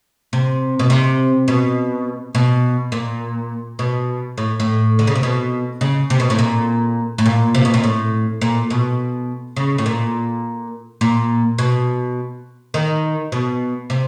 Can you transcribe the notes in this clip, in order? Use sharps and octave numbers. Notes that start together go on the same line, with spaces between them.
C3
B2
C3
B2
B2
A#2
B2
A2
A2
D3
C#3
C3
B2
C#3
C3
B2
A2
A#2
A2
A#2
C3
B2
A#2
A2
A#2
B2
C#3
A2
A#2
A#2
B2
D#3
B2
C3